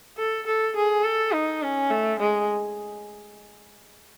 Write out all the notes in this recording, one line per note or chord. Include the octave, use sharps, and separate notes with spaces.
A4
A4
G#4
A4
D#4
C#4
A3
G#3